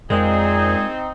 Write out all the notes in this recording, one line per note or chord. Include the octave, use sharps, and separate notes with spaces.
F2 A#2 G#3 C4 D#4 G#4